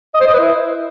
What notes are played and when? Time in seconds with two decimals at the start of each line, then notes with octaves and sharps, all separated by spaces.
0.14 D#5
0.21 C5
0.27 D#5
0.33 B4
0.40 E4